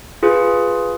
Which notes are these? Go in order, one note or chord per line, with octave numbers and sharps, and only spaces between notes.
F4 G#4 B4